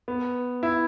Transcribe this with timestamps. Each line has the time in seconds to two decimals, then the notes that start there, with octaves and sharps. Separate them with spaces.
0.08 B3
0.63 E4